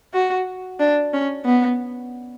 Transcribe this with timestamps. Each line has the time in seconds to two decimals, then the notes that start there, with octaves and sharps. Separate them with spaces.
0.14 F#4
0.80 D4
1.14 C#4
1.45 B3